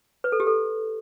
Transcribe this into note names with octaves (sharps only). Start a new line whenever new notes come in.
B4
A4
G4
A4